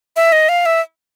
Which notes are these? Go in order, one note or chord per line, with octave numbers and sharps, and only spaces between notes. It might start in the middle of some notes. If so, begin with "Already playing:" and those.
E5
D#5
F5
E5